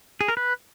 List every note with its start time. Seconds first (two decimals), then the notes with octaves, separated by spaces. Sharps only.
0.21 G#4
0.28 A#4
0.37 B4